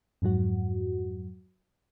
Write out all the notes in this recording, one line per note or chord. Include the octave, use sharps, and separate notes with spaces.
F2 G#2 F#3 F#4